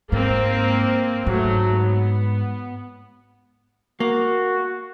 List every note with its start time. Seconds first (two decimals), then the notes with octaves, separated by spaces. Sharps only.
0.12 G#2 A#3 C4
1.27 G#2 F#3 A3
1.77 B3
4.00 A#3 F#4